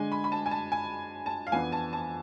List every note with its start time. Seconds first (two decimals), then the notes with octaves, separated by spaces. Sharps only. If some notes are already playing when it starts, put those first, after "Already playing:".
Already playing: D3 G#3 D4 G#5
0.12 B5
0.24 B5
0.32 A5
0.46 G#5
0.51 A5
0.72 G#5
1.26 A5
1.47 F5
1.52 F2 E3 B3 D4 G#5
1.72 A5
1.93 A5